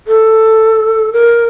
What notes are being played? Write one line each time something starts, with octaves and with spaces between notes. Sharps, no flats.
A4
A#4